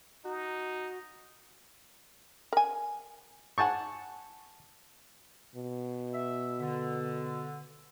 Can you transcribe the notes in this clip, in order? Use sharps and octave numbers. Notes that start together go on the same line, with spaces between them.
D#4 F#4
A#4 G#5
F#5 G#5 A5 C#6
B2
E5
D3